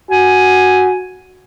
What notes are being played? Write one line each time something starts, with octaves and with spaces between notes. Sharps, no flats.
F#4 G#5